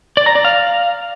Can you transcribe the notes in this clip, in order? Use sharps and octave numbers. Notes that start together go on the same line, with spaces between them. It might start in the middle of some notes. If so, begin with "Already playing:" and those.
D5
A#5
D5
F5